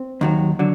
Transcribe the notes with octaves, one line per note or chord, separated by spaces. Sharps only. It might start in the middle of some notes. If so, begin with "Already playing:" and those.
Already playing: C4
D#2 D#3 F#3
D3 F#3